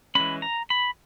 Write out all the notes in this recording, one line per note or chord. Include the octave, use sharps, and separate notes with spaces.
E3 G#3 C#4 B5
A#5
B5